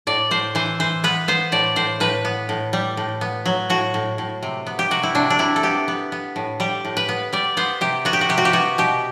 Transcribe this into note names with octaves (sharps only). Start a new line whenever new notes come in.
A2 D5
A2 C5
E3 C5
E3 C5
B3 B4
B3 C5
A2 D5
A2 C5
A2 B4
B3
A2
G3
A2
B3
F#3
A2 F#4
A2
A2
C3
B3
G4
C3 F#4
E4
C3 D4
D4
C3 E4
A4
B3 G4
B3
B3
A2
G3 G4
A2
B4
B3
G3 D5
B3 C5
C3 G4
B3 F#4
G4
F#4
C3 G4
F#4
G4
B3 F#4
B2 G4